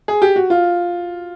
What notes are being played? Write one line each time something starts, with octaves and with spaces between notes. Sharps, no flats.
G#4
G4
F#4
F4